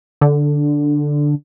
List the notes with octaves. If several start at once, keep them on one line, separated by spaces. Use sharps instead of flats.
D3